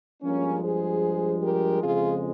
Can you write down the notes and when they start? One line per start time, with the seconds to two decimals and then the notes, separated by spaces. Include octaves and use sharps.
0.23 G2 F3 G#3 A#3 C#4
0.63 G#4 C5
1.43 G4 A#4
1.83 F2 C#3 G#3 F4 G#4